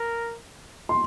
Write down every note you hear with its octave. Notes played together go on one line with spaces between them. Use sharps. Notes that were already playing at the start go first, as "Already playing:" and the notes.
Already playing: A#4
C6